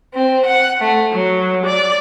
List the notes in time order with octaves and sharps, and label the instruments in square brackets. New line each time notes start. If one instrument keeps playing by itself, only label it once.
[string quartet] C4
F#5
A3
F#3
D5